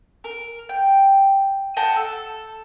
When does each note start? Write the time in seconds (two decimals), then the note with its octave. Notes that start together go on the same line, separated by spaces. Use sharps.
0.24 A#4
0.69 G5
1.77 D#5 F#5 G5 A5
1.96 A4